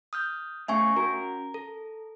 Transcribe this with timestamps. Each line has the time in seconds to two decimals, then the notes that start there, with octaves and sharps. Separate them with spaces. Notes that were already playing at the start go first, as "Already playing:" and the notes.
0.13 D#6 F6 G6
0.68 A2 C#3 E5 G#5 C#6
0.97 C#4 F#4 A#4
1.54 A4